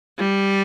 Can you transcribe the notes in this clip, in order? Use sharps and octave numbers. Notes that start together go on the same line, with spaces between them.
G3